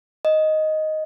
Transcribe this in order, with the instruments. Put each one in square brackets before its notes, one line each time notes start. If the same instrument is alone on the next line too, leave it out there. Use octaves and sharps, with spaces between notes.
[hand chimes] D#5